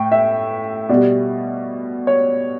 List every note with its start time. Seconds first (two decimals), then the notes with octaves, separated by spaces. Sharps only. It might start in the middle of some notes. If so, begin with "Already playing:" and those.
Already playing: A2 G5
0.12 E5
0.89 B2 G3 D5
2.07 C#5